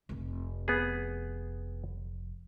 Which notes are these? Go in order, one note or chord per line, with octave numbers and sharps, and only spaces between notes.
F1 F2
B3 G#4